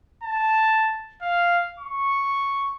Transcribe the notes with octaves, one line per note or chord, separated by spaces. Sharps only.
A5
F5
C#6